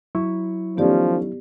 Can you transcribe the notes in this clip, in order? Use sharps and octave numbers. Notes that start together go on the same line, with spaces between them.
F#3 E4 C#6
D#3 F3 A3 B3 C#4 G4 D5